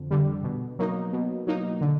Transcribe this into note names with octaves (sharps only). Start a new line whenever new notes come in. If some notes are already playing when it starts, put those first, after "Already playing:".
Already playing: F2 D3
D3 G3
B2
F#3 A#3 D#4
B2
F#3 A#3 D#4
D3